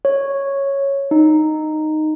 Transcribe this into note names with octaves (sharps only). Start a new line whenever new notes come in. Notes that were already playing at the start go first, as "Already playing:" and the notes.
C#5
D#4